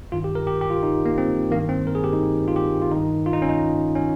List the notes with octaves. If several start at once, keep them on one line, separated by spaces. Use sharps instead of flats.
G2 D#3 F4
G4
A#4
G4
G4
F4
D#4
A#3
C4
G2 D#3 A#3
C4
A#4
G#4
G4
D#4
F4
G4
F4
G2 D#3 D#4
F4
D#4
C#4
D#4
C#4